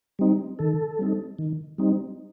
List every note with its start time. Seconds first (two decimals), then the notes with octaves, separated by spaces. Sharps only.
0.19 G3 C4 D#4
0.59 D#3 A4
0.99 G3 C4 D#4
1.39 D#3
1.78 G3 C4 D#4